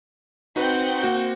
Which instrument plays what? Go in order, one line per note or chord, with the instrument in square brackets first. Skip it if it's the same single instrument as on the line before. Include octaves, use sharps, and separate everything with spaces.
[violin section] C4 F#5 G6 [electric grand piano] D#4 F#4 B4
[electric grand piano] A#3 F#4